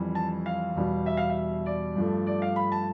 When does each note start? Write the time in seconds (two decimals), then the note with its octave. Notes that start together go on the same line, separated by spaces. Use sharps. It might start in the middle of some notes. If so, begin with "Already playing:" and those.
Already playing: F2 E3 G3
0.15 A5
0.46 F5
0.75 E2 B2 G3
1.06 E5
1.17 F5
1.29 E5
1.66 D5
1.96 G2 F3 A3
2.27 D5
2.42 F5
2.56 B5
2.72 A5